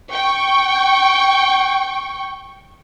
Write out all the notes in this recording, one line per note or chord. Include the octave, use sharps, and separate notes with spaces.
G5 C#6